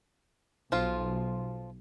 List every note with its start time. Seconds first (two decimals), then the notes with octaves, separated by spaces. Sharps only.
0.72 B1 F3 F4